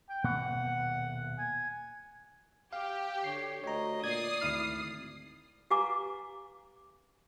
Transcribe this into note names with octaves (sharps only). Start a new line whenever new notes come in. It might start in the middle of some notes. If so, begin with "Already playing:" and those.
G5
D#1 B2 A#3 F#5
G#5
G4 F5
D3 C#5 C7
D2 C#5 D#5 A#5
A#2 D5 D#6 G#6 C7
G#1 D2 E4 F6
G4 B4 F5 G#5 A#5 D6